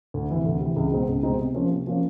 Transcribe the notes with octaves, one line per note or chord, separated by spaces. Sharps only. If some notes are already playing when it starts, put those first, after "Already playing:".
D2
C3 E3
D2
C3 E3
C#2
B2 G#3 C4 D#4
C#2
B2 G#3 C4 D#4
C3
F3 A#3 C#4
C3
F3 A#3 C#4